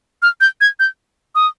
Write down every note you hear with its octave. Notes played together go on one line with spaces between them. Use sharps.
F6
G6
G#6
G6
D#6